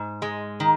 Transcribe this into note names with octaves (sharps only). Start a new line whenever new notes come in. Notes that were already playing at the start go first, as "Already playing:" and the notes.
Already playing: G#2
G#3
D#3